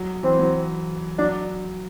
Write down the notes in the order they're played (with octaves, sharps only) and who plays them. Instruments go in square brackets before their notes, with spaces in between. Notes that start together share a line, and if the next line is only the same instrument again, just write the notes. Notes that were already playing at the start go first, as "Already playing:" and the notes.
Already playing: [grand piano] F#3
[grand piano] E3 [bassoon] C4
[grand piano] F#3
[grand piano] F#3 [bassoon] D4